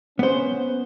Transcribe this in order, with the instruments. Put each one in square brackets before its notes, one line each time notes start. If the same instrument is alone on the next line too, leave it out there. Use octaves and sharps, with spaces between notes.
[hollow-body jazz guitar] B3 C5 [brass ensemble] C#4